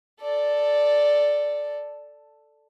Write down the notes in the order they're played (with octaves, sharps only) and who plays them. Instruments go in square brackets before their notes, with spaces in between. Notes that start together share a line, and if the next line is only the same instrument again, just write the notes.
[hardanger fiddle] A4 D5